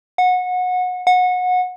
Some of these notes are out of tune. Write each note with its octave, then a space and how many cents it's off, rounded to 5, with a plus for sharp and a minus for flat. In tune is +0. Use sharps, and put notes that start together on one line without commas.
F#5 -25
F#5 -25